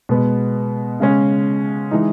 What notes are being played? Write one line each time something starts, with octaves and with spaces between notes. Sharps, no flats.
B2 G#3 B3
C#3 G#3 C#4
E3 G#3 D#4